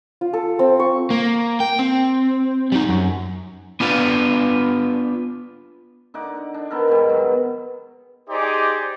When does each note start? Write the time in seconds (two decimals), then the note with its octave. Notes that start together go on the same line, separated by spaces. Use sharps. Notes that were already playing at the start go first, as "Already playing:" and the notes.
0.21 F4
0.33 A4
0.59 C4
0.79 C#6
1.10 A#3
1.60 G5
1.79 C4
2.72 G3 D#4
2.89 F#2
3.80 B3 D4 F4 B4 F5
6.14 D3 D#4 F#5 D6
6.54 D4
6.70 D#3 B3 A4 A#4
6.88 G#2 B2 G3
7.09 F#3
8.30 D#4 G4 G#4 C5 D5 D#5